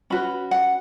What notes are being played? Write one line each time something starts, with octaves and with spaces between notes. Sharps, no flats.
C#4 F#4 B4 B5
F#5